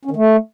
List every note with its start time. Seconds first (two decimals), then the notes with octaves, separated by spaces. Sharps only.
0.05 C#4
0.11 D#3
0.16 A3